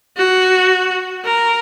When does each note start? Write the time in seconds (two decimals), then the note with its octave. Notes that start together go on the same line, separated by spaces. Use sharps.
0.17 F#4
1.24 A#4